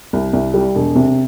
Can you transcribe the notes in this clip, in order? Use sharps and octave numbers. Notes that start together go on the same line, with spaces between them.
C2
C2
G3
E1
C3